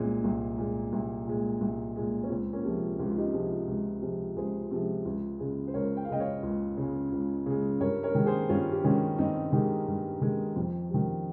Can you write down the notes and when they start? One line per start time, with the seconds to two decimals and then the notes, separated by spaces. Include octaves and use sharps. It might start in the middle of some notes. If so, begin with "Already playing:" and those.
Already playing: C2 A#2 G#3 C4
0.24 C2
0.58 A#2 G#3
0.93 C2
1.27 A#2 G#3
1.61 C2
1.96 A#2 G#3
2.23 C#4
2.30 C#2 C4
2.53 A#3 C#4
2.64 C3 F3 G#3
2.99 C#2 G4
3.08 F4
3.17 D#4 G4
3.33 C3 F3 G#3
3.68 C#2
4.02 C3 F3 G#3
4.36 C#2 G#4 C5
4.71 C3 F3 G#3
5.05 C#2
5.39 C#3 G#3
5.67 C5
5.74 C#2 A#4 C#5
5.97 G5
6.04 F5
6.09 C#3 G#3 D#5 G5
6.20 C#5 F5
6.43 C#2
6.77 C#3 G#3
7.12 C#2
7.46 C#3 G#3
7.80 G2 A#4 C#5
8.03 A#4 C#5
8.15 D#3 G#3
8.26 G#4 C5
8.49 G2 C#4 F4
8.72 G4
8.83 D#3 G#3 C#4 F4
9.18 G2 C4 D#4
9.52 D#3 G#3 D#4 G4
9.87 G2
10.21 D#3 G#3
10.56 F2
10.90 D#3 G3